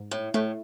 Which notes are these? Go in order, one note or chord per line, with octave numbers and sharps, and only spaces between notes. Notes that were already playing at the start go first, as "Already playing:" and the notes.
Already playing: G#2
A2
A2 A3